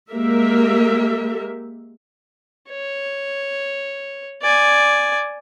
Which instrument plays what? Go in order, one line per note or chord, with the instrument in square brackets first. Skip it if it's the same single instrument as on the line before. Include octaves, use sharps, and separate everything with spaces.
[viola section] G#3 A#3 G4 A#4 E5
[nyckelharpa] C#5
D5 G#5